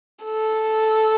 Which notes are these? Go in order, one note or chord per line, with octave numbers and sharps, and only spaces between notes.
A4